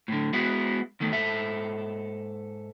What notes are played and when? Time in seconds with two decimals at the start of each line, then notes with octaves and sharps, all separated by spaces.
0.08 A2 D3
0.33 G#3 B3 E4 F#4
1.00 E2 D#3 A3
1.13 G#2 A4 E5